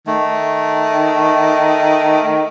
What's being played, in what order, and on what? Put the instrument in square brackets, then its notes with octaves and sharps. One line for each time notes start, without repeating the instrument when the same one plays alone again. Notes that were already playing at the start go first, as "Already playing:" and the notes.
[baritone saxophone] D#3 [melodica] A3